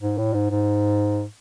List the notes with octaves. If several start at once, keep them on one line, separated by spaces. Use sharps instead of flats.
G#2
A2
G#2
G#2